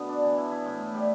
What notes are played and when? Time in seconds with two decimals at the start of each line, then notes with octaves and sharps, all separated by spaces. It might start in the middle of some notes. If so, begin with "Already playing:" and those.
Already playing: B2 D3 A3 B3
0.09 D4
0.23 E3
0.38 E4
0.51 E4
0.66 A2
0.81 A2
0.94 G3